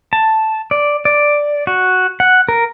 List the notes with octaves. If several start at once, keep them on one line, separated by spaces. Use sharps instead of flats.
A5
D5
D5
F#4
F#5
A#4